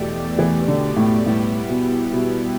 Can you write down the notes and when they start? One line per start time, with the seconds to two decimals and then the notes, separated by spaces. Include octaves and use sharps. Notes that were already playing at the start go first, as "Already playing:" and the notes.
Already playing: E2 B2 A3 G4 D5
0.39 E3
0.68 D3
0.96 A2
1.26 A2 G3 B3 E4 G4
1.69 B2
2.13 B2